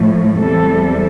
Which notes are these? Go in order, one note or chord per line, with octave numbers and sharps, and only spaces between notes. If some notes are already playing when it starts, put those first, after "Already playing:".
Already playing: A2 F3 A3
E2 C3 G3 A4